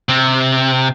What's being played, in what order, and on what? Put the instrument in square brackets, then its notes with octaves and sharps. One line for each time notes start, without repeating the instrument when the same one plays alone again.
[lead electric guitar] C3